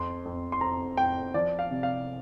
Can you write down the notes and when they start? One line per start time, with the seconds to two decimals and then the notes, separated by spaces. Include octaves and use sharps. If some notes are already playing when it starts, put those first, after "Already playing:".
Already playing: F2 C6
0.25 F2
0.52 C6
0.61 F2 A#5
0.97 F2 G5
1.34 F3 D5
1.59 F5
1.71 C3
1.83 F5